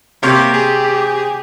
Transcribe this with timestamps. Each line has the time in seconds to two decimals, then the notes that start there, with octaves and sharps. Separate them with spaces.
0.23 C3 A#3 G4 C#5
0.54 G#4